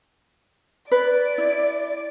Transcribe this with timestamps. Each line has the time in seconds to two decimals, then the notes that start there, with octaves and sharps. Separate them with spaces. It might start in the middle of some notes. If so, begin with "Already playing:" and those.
0.91 B4 D5
1.38 E4